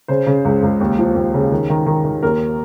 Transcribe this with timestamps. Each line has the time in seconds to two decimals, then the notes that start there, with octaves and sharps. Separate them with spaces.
0.08 C#3 C5
0.26 C#3
0.45 C#2
0.63 C#2
0.81 D#2
0.98 F3
1.15 D#2
1.34 C#3
1.52 D#3
1.70 D#3
1.86 D#3
2.05 D#3
2.23 D#2 A#4